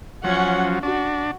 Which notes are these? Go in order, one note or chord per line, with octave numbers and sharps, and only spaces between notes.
F3 F#3 C#4 F#5
D4 F#4